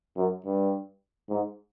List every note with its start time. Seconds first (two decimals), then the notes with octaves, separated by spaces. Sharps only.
0.17 F#2
0.45 G2
1.29 G#2